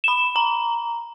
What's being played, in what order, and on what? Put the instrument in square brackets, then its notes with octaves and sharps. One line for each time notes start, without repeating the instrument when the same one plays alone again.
[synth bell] B5 E7
A#5